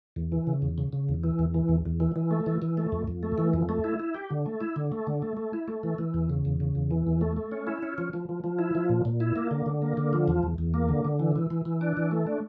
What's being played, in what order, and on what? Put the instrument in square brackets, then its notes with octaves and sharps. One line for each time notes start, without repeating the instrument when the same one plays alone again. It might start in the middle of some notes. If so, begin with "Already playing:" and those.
[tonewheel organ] E2
E3
C#3
E2
C#3
C#3
E2
E3
E2
E3
E2
E2
E3
E3
A3
E3
E3
A3
F2
F2
A3
E3
F2
A3
E4
E4
G4
D3
A3
E4
D3
A3
D3
A3
A3
E4
A3
E3
E3
E2
C#3
E2
C#3
E2
E3
E2
A3
A3
C#4
E4
C#4
F3
F3
F3
F3
E4
F3
A#2
A#2
E4
A#3
D3
D3
A#3
D3
F3
E2
E2
E2
A#3
D3
D3
E3
E3
E3
E3
D4
E3
A3
D4